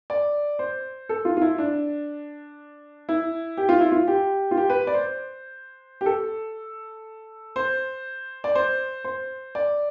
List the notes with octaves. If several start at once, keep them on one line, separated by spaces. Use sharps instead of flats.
D5
C5
A4
F4
F4
E4
D4
E4
G4
F4
E4
F4
G4
F4
G4
B4
D5
C5
G4
A4
C5
D5
C5
C5
D5